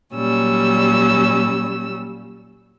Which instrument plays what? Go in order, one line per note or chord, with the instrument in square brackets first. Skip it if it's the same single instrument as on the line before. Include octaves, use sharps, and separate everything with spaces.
[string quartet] A#2 F#3 G3 C#4 E6